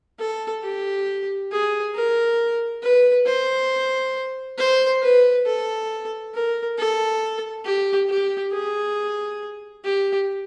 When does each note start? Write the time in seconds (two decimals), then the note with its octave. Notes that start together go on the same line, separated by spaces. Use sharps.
0.19 A4
0.63 G4
1.51 G#4
1.95 A#4
2.83 B4
3.26 C5
4.58 C5
5.02 B4
5.46 A4
6.34 A#4
6.78 A4
7.64 G4
8.09 G4
8.52 G#4
9.84 G4